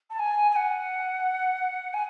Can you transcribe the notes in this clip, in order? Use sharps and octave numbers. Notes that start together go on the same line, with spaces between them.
A5
G#5
G#5
F#5
G#5